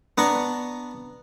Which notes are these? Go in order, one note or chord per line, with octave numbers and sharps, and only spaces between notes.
B3 D4 A#5 C#6